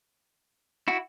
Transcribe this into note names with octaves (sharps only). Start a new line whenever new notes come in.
E4 F#4